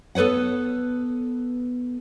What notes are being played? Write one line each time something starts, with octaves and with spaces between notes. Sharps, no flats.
B3 A4 B4 C#5 F#5